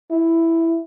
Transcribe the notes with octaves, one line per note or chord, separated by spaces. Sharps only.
E4